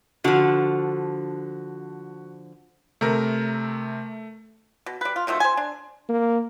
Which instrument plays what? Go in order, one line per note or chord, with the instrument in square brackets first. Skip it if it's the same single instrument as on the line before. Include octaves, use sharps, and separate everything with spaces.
[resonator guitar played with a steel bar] D3 F3 [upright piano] F#4
[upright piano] C3 A#4 [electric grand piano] A3
[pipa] B2
G3 B4
F4
B2 D#3 F3 A3
C5 G#5
D4
[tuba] A#3